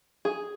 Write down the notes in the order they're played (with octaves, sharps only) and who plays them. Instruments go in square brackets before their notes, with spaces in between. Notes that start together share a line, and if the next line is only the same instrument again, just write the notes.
[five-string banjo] G#4